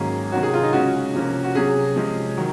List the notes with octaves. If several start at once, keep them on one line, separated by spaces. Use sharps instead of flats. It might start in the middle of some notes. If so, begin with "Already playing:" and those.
Already playing: G#2 D#3 F#3 A#3 C#4 G#4
C3 D#3 F#3 C#4 F#4
G#4
F4
D#4
C#3 G#3 C#4 F#4
C3 F3 A#3 C#4
F#4
C3 F#3 C#4 G#4
C3 F3 G#3 C#4
D#3 F#3